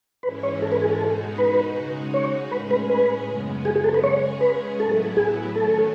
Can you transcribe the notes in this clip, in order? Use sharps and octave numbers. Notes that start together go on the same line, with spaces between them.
G#2 E3 G#3 C#4 E4 B4
C#5
A4
B4
G#4
A4
B2 G#3 D#4 F#4
B4
C#3 G#3 D#4 F#4
C#5
A2 G#3 C#4 G#4 B4
B4
B4
F#2 C#3 G#3 B3
G#4
G#4
A4
B4
C#3 G#3 C#4 G#4 C#5
B4
A2 F#3 B3 E4 A4
G#4
D#3 F#3 A3 C#4 A4